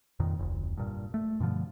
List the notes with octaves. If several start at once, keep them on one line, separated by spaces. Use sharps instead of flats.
F2 A#2 D#3
F1 D2
G2 A#2
A3
G2 B2 D3 F3